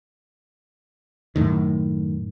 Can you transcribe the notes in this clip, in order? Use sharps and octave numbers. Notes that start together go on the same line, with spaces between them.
F#2 A2 D#3